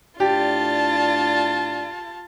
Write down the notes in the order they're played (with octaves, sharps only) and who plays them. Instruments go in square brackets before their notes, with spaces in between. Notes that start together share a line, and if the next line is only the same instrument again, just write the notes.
[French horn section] A2 D4 D5 [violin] F4 A5 [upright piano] G4